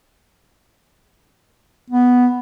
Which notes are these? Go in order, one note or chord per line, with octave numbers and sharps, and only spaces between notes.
B3